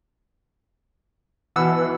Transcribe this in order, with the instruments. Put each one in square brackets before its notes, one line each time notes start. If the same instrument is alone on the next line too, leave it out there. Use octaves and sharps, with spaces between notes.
[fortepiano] B2 F#5 E6 [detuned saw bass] E3